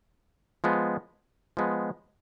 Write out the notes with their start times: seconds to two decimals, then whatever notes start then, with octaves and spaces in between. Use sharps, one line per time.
0.64 F3 G#3 B3
1.57 F3 G#3 B3